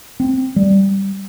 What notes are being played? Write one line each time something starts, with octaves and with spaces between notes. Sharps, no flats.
C4
G3